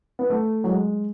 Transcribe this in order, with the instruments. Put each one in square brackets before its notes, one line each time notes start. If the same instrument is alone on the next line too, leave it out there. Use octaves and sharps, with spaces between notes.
[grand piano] B3
A3
F#3
G#3